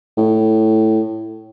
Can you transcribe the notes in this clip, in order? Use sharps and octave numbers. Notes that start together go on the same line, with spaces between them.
A2